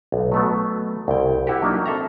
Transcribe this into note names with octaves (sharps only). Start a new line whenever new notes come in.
B1
F#3 A3 B3
C2 G5
E4 F#4 G4
F#3 A#3 D4 D#4
C4 A4 E5 A#5